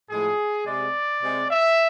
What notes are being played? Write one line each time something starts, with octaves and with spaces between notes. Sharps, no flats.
A2 F3 G#3 G#4
C3 G#3 D5
C3 G#3
E5